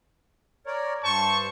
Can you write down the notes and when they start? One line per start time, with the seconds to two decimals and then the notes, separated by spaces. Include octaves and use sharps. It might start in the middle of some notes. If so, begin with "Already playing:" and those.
0.66 A#4 C#5 D5
1.03 G2 C5 A5 C#6